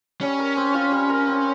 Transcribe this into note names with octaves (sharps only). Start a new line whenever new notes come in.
G3 C#4
A#4
C4
F4
G3
A#4
C4